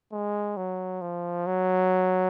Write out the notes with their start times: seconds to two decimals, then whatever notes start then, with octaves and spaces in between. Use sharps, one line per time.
0.13 G#3
0.57 F#3
1.02 F3
1.47 F#3